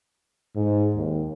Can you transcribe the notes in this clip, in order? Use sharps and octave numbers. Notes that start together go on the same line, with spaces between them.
G#2
D#2